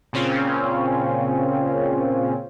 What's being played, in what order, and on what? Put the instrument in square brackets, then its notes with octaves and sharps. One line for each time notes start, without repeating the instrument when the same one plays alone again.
[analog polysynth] A#2 C#3 C4 C#4 F4